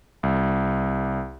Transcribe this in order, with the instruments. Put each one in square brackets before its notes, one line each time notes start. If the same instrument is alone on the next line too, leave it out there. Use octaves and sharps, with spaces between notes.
[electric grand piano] C2